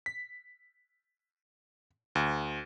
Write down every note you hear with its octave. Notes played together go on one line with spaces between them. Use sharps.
B6
D2